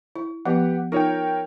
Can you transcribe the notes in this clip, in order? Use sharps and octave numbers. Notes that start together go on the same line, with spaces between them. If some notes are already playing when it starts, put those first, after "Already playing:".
E4
F3 B3 G4 B4 F#5
D#4 F4 A#4 C#5 G5